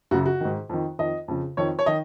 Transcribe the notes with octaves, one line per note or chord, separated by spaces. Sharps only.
F#2 C#3 F#4
F#4
G#2 D#3
F2 D#3
F2 D#3 D#5
F2 C#3
F2 D#3 C#5
C#5
D#3 D#5